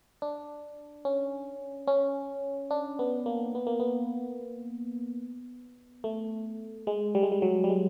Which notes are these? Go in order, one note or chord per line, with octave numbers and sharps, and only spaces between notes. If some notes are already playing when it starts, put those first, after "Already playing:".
D4
C#4
C#4
D4
B3
A#3
B3
A#3
B3
A3
G#3
G3
G#3
G3
F#3
G3
G#3